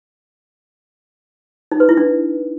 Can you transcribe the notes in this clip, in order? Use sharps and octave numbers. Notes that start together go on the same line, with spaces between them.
D#4
B4
E4
D4